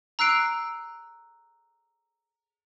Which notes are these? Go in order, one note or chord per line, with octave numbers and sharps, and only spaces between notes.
A#5 E6 F#6 C7 D7